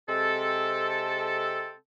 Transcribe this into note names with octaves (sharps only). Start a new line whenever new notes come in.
C3 G#3 C4 A4